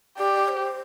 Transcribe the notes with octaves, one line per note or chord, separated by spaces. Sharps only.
G4 D5
C5